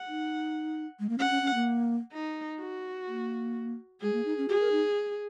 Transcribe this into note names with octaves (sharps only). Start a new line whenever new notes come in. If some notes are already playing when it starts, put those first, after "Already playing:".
Already playing: F#5
D#4
G#3
A#3
C#4 F#5
C#4
C#4
A#3
D#4
F#4
A#3
G#3 G#4
A#3
D#4
C#4
F#4 G#4
A#4
D#4